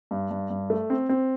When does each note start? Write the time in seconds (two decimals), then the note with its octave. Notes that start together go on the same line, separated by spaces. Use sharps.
0.11 G2
0.31 G2
0.50 G2
0.70 A3
0.90 C4
1.09 C4